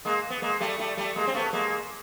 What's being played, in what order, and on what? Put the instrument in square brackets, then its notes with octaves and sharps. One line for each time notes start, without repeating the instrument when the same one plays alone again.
[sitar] G#3 A#3
B3
G#3 A#3
G3 A3
G3 A3
G3 A3
G#3 A#3
C4
A3 B3
G#3 A#3